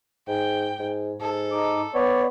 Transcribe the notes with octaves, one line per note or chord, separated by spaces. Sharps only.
G#2 G5
G#2
G#2 A4
D#4 D6
B3 C#5 D5